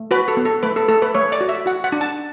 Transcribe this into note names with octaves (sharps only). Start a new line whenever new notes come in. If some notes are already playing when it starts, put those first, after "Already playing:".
Already playing: A3
F#4 B4
A4
B3
A4
A3 B4
A4
A3 A4
B4
A3 C#5
D5
F#4
E5
F#4 F#5
F#5
D4
A5